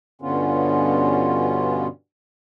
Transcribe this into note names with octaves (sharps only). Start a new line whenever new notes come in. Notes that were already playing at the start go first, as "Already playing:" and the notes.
G2 B2 D3 B3 C#4 F4